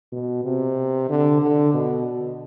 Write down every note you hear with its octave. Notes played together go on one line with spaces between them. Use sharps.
B2
C3
D3
D3
B2